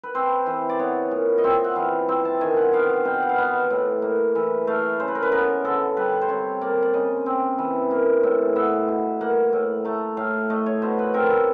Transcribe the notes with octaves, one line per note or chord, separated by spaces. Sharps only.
B4
C4 C5
E3
D5
B3 C#5
A#2
D#5
C4 E5
F#5
E3 F5
C4 E5
A5
D#3 G#5
F#5
B3 F5
F5
B2 G5
F#5
F5
B3 F#5
A2
A#3
E3
A3 F5
C#3 C5
B4
A#4
B4
B3 A#4
D3 A4
G3 B4
C5
C3 C#5
A#3 D5
D5
C#3 D#5
C4
E3
A#3
A2
B3 E5
B2
A#3 F#5
A2
A3 A#5
A2 F5
A3 D#5
C#5
B2 C5
B4
C4 A#4
A4